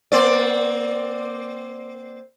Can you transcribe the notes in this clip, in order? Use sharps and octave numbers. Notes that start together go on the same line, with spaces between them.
A#3 C4 D5